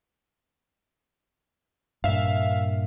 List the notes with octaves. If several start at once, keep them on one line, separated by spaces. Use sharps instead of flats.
G2 A#2 E5 F5